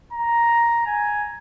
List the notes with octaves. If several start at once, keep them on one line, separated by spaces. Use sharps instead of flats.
A#5
G#5